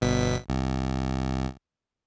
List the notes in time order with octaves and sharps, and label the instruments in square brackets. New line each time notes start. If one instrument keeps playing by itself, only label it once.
[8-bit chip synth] G1 B2 B6
C2